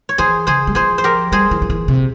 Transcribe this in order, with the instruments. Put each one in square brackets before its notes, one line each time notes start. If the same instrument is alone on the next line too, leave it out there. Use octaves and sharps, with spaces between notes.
[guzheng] C#5
[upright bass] E3 [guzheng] G#4 C5
[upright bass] C#3 [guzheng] G#4 C5
[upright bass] G3
[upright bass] F3 [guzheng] G#4 C5
[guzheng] C5
G4 A#4
[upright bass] G3 [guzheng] G#4 C5
[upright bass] E3
F3
E3
C3